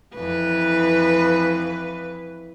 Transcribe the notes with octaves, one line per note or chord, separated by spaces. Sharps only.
F2 E3 B4